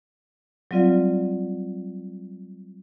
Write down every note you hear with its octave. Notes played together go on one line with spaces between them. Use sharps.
F#3 G3 C4 F4 D5 F5